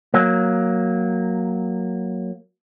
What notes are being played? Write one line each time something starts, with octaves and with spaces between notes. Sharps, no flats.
F#3 A#3